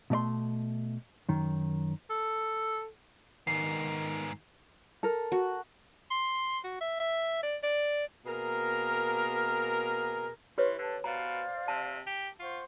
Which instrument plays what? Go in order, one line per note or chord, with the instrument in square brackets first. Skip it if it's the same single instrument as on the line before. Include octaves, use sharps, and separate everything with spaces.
[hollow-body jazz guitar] B2 A3 D5 C6
F#2 D#3
[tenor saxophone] A4
[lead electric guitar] G#2 B3 [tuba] D#3 [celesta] C7
[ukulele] A4 A#4
[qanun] F#4
[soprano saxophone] C6
F#4
E5
E5
D5
D5
[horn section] B2 A#3 G#4 A#4
[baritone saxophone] E3 [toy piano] G4 B4 C#5 [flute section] C6 C#6
[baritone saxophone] D3 [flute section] A5
[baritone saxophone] B2 [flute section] C5 D5 F5 [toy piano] A#5
[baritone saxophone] C3 [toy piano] A5
[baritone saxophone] G4
[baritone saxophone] F4 [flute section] C5 F#5 C#6